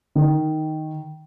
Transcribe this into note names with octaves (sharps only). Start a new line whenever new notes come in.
D#3